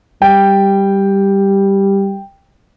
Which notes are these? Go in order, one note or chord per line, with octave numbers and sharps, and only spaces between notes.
G3 G5